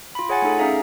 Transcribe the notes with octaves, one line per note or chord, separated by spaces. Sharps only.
F4 B5
G#4 C#5 F#5 G#5 A6 C#7
A3 D#4 A4
C#4 D#4 G#4 E5 F5 A#5